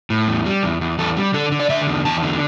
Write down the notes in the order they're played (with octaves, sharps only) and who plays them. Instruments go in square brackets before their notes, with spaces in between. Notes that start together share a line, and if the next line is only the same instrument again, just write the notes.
[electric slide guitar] A2
E2
G3
E2
E2
E2 A4
G3
D3 A4
D3
D5
D3 E5
E2
E2 A5
D3